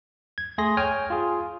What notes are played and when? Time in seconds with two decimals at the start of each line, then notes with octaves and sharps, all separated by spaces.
0.38 G#6
0.58 A3 G#4 C6 A#6
0.77 C#5 G5 G#5 F6
1.10 F4 G#4